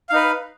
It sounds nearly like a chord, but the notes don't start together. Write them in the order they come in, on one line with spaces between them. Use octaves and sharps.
F5 D#4 B4